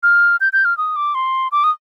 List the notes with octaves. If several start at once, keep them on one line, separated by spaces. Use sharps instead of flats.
F6
G6
G6
F6
D#6
D6
C6
D6
D#6